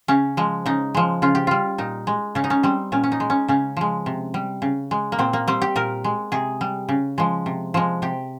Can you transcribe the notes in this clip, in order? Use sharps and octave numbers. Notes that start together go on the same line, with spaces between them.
C#3 C#4
F3 G#3
C#3 D#4
F3 G#3
C#3 F4
G4
G3 F4
A#2 D#4
G#3
C#3 C#4
D#4
C#4
G3 C4
A#2 C#4
C#4
D#4
G#3
C#4
C#3 C#4
F3 G#3
C3
G3
C#3
G#3
A#3
A#2 C4
A#3
G3 C4
G4
A#2 A#4
G#3
C3 G#4
G3
C#3
F3 G#3
C3
F3 G#3
C3 G4